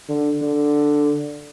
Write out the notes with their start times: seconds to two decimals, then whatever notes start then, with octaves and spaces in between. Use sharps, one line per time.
0.09 D3
0.42 D3